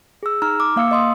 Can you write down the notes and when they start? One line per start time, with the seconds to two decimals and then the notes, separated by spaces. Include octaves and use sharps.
0.23 G#4 E6
0.42 D#4 A#5 F6
0.60 D6
0.76 A#3 F5 E6 C#7
0.91 D#5 C6 D#6